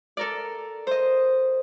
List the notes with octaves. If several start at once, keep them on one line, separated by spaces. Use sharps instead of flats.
A4 A#4 D5
C5 D#5